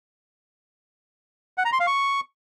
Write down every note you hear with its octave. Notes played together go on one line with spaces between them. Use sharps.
F#5
A#5
C6
F5
C#6